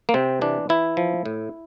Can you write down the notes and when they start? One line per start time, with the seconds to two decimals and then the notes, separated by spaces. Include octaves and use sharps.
0.09 A#3
0.14 C3 C4
0.41 E3 D4
0.69 E3 E4
0.97 F3
1.25 A2